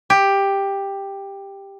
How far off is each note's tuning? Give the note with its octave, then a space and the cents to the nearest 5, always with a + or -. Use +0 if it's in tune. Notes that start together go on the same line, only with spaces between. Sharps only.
G4 +10